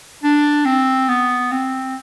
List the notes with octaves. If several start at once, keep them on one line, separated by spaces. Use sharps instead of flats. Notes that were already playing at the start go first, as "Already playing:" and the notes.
D4
C4
B3
C4